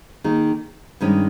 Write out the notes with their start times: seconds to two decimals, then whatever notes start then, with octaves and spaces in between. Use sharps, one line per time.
0.24 D#3 A#3 D#4 G#4
1.01 G2 D#3 G#3 C#4